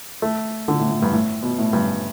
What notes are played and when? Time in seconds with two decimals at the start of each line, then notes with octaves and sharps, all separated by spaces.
0.22 A3
0.68 D3
0.79 A2
0.90 A2
1.02 G2
1.13 A2
1.43 B2
1.58 A2
1.73 G2